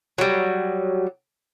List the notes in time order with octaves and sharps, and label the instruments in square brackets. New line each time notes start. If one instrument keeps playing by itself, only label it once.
[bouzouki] F#3 G3